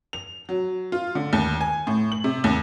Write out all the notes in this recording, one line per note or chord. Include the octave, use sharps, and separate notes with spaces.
F7
F#3
F4
D3
D#2
G#5
A2
F#7
C3
D#2